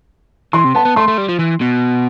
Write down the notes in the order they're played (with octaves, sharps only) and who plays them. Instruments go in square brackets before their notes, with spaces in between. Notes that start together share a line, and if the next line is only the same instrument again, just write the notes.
[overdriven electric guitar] E3 [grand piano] C6
[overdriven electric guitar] C3
[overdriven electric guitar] B3 [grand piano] A5
[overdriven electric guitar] B3
[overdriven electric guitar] A3 [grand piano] C6
[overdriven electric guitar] A3
G3
F3
E3
B2